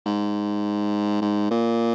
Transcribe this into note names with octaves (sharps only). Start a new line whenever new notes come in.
G#2
G#2
A#2